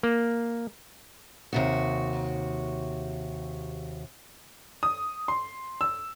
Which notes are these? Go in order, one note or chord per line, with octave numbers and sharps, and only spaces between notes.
A#3
D#2 C3 F#4
D#6
C6
E6